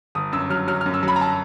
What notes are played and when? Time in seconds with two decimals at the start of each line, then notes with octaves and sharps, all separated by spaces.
0.15 G1 D#6
0.32 F#2 E6
0.50 F#3 F6
0.67 F#3 F6
0.81 F6
0.86 F#2
0.94 E6
1.03 F#3
1.08 B5
1.16 A#5
1.21 A5